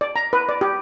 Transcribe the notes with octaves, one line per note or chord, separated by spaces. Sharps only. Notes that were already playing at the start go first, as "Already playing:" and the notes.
D5
A#5
B4
D5
G4